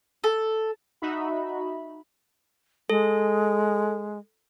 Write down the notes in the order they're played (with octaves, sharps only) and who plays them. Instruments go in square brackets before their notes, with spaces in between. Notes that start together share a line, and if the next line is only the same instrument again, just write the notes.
[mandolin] A4
[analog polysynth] D#4 F#4 E5 B5
[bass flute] G#3 [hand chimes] A4